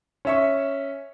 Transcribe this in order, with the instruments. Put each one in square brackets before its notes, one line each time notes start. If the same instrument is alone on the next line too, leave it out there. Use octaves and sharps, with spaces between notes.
[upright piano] C#4 E5 C#6